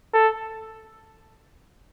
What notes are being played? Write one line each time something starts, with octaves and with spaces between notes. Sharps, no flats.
A4